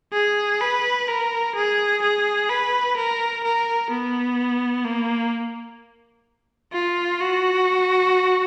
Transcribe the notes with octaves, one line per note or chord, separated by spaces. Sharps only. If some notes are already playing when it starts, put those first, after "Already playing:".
G#4
B4
A#4
G#4
G#4
B4
A#4
A#4
B3
A#3
F4
F#4